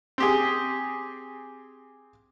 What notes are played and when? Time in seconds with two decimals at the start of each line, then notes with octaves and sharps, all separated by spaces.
0.18 C4 G4 G#4